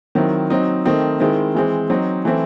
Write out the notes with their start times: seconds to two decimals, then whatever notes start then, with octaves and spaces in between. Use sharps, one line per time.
0.15 D#3 F#3 C4 E4
0.50 F#3 C4 D#4
0.85 D#3 A3 C4 D#4
1.20 D#3 G#3 C4 E4
1.55 E3 G#3 C4
1.90 F#3 C4 D#4
2.25 E3 A3 C4 E4